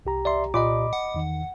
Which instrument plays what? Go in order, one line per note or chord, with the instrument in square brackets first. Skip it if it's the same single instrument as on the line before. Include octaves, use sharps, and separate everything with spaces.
[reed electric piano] C2 G4 A#5
[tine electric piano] D5 E5 C6
[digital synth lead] A#2 [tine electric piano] D#5 B5 D6
[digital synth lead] F#5
[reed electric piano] E2 D#3